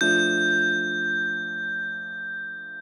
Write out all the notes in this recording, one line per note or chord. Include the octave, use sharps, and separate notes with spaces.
F3 A3 D4 G6